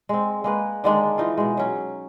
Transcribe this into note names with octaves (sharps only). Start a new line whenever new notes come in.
G#3 C4
G#3 A#3 B4
D3 D#3 G#3 D4
E3 D#4 F4
B2 G#3
F#3 C#4